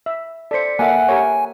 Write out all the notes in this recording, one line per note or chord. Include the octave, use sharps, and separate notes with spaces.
E5
A4 C5 D5 B6 C#7
A#3 A4 E5 F#5 G#5 F#6
G4 A#4 C#5